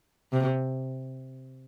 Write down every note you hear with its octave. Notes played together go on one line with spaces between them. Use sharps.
C3